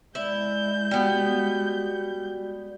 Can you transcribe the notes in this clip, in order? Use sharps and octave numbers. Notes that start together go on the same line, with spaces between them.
G#3 E4 D5 G6
G3 B3 F#4 G4